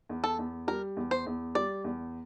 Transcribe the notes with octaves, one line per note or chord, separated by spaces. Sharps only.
E2
A4
E2
G3 A#4
E2
C5
E2
G3 D5
E2